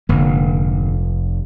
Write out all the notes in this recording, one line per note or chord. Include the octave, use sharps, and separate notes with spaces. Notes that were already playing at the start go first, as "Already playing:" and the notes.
F1 G#2 D3 A#3